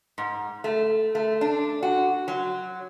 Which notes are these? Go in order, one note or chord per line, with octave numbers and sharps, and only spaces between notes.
G#2
A3
A3
D4
F#4
F#3